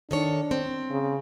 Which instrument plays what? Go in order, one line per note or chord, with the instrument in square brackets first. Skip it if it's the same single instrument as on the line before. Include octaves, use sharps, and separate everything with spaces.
[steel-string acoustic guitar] D#3 A4 C#5 [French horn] D4
[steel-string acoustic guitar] C4
[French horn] C#3